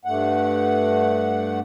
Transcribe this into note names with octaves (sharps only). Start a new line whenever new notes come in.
G2 A3 F#5